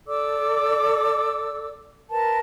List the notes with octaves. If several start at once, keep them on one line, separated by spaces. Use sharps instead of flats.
A4 D5 D6 E6
A#4 B4 A5